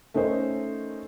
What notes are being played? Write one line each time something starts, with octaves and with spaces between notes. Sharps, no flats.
A3 C#4 D#4 A#4 C5